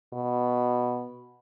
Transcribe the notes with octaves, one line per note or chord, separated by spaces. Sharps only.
B2